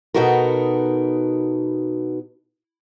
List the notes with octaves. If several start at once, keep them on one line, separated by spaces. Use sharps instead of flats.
B2 B3 D#4 F#4 A4 A#4